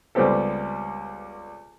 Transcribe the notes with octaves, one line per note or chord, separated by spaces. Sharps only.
C#2 G3 B3 C4 G4 A4